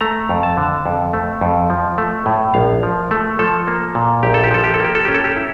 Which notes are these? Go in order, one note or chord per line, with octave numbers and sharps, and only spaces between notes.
A3 A#5
F2
A5
D3
F2
A3
F2
F3
A3
A2
A#1 F5
F3
A3
F3 A4
A#3
A#2
A#1 G4
A4
G4
F3 A4
G4
A4
A#3 G4
A4
C#4 G4
A4
G4
E4